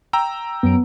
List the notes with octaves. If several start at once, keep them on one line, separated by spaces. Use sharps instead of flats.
G5 A#5 E6
F#2 F#3 B3 D7